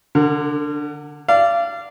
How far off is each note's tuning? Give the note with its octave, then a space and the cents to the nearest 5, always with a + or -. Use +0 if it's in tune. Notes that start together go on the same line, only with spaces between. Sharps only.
D3 +0 A#4 -45
D5 -10 F5 -35